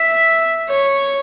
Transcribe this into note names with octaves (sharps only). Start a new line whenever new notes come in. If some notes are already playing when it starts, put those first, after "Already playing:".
Already playing: E5
C#5